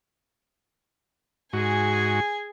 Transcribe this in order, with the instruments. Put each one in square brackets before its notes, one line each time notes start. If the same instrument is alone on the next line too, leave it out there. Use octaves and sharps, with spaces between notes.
[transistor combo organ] G#2 F#4 [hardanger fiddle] G#4 G#5